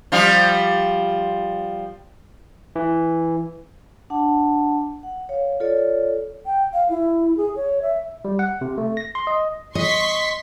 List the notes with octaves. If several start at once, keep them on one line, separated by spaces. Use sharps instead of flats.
F3 G3 F4
E3
D4 F#5 A5
F#5
C#5 F5
F4 A4 C#5 D5
G5
F5
E4
G#4
C#5
E5
G3
F#5
C3
A3
A#6
C6
D#5
D#5 C6 C#6 B6